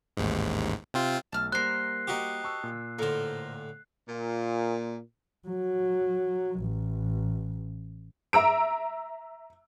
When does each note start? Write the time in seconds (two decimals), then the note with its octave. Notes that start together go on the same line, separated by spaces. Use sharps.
0.17 A1 D#2 G#2
0.94 C3 C4 F4
1.32 B1 A3 A5 E6 F6
1.52 G3 A#3 A#4 C5 F#6 C7
2.07 D#4 F#4 G4
2.44 A5 C#6 E6
2.64 A#2
2.99 A2 D3 A#4 C5
4.09 A#2
5.48 F#3
6.61 A1
8.33 E5 A#5 E6 D7